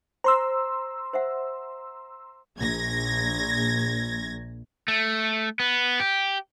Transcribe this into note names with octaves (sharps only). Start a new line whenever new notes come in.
C5 A#5 C6 E6
C5 E5 F#5
A#1 G#6 A#6
A3
B3
G4